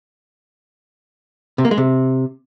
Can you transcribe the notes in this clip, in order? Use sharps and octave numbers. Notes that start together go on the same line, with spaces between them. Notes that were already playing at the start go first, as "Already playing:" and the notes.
C3
A#3
G#3
C3